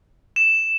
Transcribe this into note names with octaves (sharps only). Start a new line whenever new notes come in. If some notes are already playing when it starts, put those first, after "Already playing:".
E7